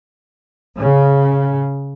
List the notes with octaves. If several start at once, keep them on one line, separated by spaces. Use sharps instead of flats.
C#3